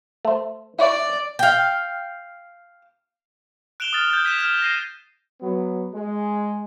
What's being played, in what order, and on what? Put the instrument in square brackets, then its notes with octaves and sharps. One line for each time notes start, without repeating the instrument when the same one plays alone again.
[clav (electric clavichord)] A3 C5
[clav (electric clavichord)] E4 C#5 [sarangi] D5
[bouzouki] F5 G5
[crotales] F#6 D7 E7 F7 G7
D#6 F6 A6
G6 A6
G6 G#6 B6 D#7 E7
F6 E7
A#6 C7 D#7
[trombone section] F#3 B3
G#3